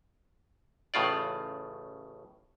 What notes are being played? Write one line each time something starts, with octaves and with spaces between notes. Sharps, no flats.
A1 A2 C#3 F4 D5